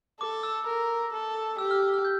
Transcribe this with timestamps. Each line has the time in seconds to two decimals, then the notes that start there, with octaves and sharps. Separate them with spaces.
0.20 A4 D6
0.43 E6
0.67 A#4
1.13 A4
1.58 G4 E6
1.71 F6
1.82 E6
1.94 F6
2.05 G6